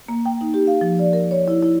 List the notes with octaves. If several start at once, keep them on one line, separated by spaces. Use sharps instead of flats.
A#3
G5
D#4
G4
F5
F3
D5
A#4
C#5
E4
E4